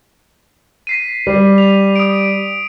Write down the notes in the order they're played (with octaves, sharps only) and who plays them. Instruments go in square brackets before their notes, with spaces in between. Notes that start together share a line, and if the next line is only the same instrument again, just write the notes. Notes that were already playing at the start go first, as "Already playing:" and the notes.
[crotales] B6 C7 D#7
[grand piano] G3 [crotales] C7
[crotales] F7
D#6 D7